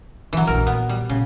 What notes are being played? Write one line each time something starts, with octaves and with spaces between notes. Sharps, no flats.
D3 E3 F#3
A#1 E2 A#4
A#2 B3
G3
A#2 C#3